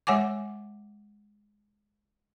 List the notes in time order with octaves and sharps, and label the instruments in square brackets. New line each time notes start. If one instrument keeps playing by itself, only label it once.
[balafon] G#3 C#5 F#5 G#5 D6